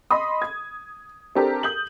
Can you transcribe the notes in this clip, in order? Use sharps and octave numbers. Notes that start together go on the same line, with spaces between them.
D#5 B5 C6 D#6
G#6
C4 D4 G4 A4 A#4
D#6 G6 F#7